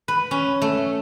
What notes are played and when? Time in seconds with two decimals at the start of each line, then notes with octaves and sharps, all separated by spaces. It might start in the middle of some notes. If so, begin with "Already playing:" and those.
0.08 B4
0.31 C#4
0.62 A3